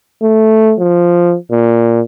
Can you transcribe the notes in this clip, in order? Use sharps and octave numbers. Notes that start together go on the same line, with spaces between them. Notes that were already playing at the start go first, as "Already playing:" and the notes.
A3
F3
A#2